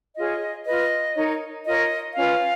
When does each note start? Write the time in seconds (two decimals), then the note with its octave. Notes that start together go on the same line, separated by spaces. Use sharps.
0.16 F4 G#4 C#5 D#5
0.66 F4 B4 D#5
1.16 D#4 A#4 C#5
1.65 F4 A#4 C#5 D#5
2.15 C#4 F4 B4 F5